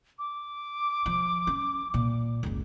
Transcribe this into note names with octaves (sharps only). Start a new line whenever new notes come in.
D6
F3
C#4
A#2
F#1 C#2